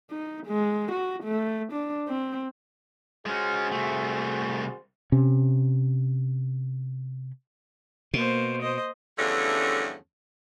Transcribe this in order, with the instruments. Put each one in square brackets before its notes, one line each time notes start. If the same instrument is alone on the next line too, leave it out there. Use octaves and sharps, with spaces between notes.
[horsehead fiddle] D#4
G#3
F#4
A3
D4
C4
[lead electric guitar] G#3 C#4 [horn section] F#4 G#4 C5
[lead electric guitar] C2 A3
[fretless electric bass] C3 C#4
[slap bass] B2 [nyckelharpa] A#3 C5
[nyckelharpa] C5 D#5
[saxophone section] E2 G2 D3 F3 A3 C#4